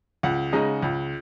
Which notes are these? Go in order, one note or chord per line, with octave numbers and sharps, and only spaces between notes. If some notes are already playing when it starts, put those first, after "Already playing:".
C#2 F#5
C#3 G#3 D#4
C#2